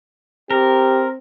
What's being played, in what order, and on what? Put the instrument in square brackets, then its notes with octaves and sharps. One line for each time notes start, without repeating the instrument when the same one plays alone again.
[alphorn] C4 [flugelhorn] G4 [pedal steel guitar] A#4